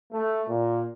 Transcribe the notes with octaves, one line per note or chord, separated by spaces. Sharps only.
A3
A#2